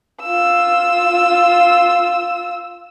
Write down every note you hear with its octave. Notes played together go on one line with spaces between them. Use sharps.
F4 E6